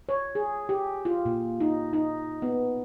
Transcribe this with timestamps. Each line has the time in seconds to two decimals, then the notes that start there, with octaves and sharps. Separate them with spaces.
0.09 C#5
0.35 G#4
0.69 G4
1.05 F4
1.25 A#2
1.60 D#4
1.93 D#4
2.42 B3